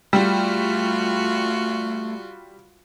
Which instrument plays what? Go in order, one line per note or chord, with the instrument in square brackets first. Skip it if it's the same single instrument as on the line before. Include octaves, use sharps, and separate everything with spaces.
[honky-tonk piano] G3 [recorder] A3 [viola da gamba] F4 F#4